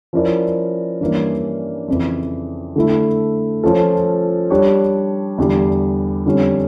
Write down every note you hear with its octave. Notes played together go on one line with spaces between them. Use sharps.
F3 C#4 E4 A#4 D5
G2 E3 A#3 C#4
F2 C#3 E3
D3 A3 E4
F3 C#4 F4 A4
G3 D4 G4 C#5
E2 D3 G3
F2 D3 G3 C#4